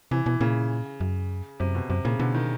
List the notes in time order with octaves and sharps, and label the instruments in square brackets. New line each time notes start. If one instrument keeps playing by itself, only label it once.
[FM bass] C3 [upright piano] E3
[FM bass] B2 [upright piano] E3
[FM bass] A#2 [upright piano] C#3
[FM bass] F#2
[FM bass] F#2 [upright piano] C3
[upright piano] B2
[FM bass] F#2 [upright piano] C3
[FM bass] A#2 [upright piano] C#3
[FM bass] B2 [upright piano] D3
[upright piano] D#3